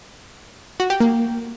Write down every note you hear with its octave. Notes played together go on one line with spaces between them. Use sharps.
F#4
G4
A#3